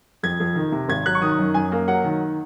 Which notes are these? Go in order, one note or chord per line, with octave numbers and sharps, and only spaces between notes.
F2 G#6
F2
D#3
C3
G#1 G#6
F#3 F#6
C#6
D#3 D#6
F#2
F#2 G#5
A#3
F#3 F#5
D#3